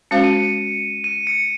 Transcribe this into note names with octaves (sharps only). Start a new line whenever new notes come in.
G#3 C#4 F#4 C5 F5 C#7
D#7
C#7
D#7
C#7